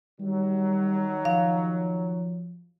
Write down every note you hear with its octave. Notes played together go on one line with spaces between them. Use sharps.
D#3 F#3 G3
F3 F5